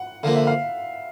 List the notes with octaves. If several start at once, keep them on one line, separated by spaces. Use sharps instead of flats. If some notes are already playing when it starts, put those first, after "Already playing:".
Already playing: F#5
D3 F3 A#3 F5
E5
F5